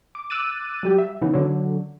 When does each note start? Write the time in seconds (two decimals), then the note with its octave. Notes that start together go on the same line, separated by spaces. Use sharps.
0.15 D6
0.30 D6 E6 F#6 A6 D#7
0.83 F#3 G3 G4
0.98 E5
1.21 C#3 E3 B3 D#4
1.34 D3 F#3